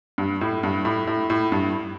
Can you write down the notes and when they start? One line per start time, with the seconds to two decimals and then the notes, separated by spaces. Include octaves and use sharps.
0.18 G2
0.41 A2
0.63 G2
0.85 A2
1.07 A2
1.30 A2
1.52 G2